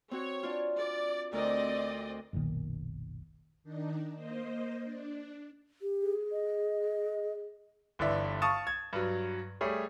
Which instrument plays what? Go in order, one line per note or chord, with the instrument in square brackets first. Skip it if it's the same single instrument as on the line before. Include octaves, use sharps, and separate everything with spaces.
[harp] C4 F#4 [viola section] C#5
[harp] D4 F4
[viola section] D5
[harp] D2 A#4 [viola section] C4 D5 D#5
[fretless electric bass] F#1 B1 A#2 D#3
[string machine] D#3 D4 D#4
A#3 C5 D#5
D4
[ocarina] G4
[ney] G#4
[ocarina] D#5
[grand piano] G1 D3 E3 D5 E5
F5 A5 C#6 D#6 A6 E7
G#6
G2 F#3
G3 A3 G#4 C#5